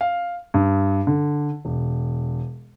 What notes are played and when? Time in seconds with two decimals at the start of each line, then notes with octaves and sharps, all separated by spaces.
0.01 F5
0.54 G2
1.07 D3
1.65 E1